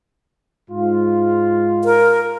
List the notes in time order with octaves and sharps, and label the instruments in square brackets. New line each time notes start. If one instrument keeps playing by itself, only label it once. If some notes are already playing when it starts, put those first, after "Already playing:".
[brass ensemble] G#2 F4
[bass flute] A#4